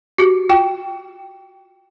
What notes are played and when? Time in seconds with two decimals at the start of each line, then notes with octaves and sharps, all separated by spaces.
0.18 F#4 G4
0.49 F4 G5